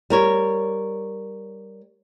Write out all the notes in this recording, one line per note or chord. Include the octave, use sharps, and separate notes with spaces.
G3 A#4 C#5